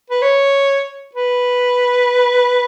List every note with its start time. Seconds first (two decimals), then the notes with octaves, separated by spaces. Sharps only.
0.10 B4
0.22 C#5
1.15 B4